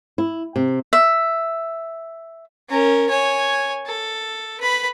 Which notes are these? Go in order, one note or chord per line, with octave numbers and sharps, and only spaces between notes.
E4
C3
E5
C#4 A#4
C#5 G#5
A4
B4 B5